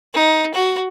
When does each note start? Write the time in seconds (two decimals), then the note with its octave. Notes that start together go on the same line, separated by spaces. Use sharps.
0.14 D#4
0.54 F#4